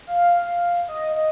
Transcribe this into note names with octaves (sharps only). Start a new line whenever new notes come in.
F5
D#5
D#5